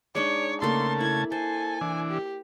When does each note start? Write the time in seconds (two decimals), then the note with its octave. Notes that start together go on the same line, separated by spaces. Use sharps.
0.15 G#3 D4 D#4 C#5 D5
0.62 C#3 A3 A#3 A4 A5 C6
1.01 E4 G#6
1.32 A4 C5 G#5
1.81 E3 D4
2.11 G4